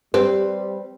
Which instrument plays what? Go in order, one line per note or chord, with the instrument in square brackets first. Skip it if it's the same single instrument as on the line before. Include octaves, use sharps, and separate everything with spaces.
[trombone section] G3 [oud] C4 [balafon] G4 [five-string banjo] B4